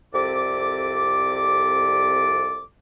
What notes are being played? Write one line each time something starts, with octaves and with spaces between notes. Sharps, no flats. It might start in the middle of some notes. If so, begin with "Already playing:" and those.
C2 F2 C3 A4 D5 D6